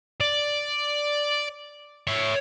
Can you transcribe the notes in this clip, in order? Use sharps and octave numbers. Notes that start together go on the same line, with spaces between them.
D5
C#5 E5